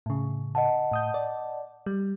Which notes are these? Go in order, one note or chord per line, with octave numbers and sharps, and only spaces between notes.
A2 C#3
D#5 F#5 A5
A2 D#6 G6
D5
G3